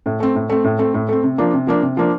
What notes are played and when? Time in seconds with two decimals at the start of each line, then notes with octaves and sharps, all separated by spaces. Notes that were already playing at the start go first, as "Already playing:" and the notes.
0.06 A2
0.20 A3 C4
0.35 A2
0.50 A3 C4
0.64 A2
0.79 A3 C4
0.94 A2
1.09 A3 C4
1.23 C3
1.38 F3 A#3 D4
1.53 C3
1.67 F3 A#3 D4
1.82 C3
1.97 F3 A#3 D4